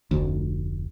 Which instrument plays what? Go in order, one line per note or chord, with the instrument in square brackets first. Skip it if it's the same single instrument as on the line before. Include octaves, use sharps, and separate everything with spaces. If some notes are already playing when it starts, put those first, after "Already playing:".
[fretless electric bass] F1 D2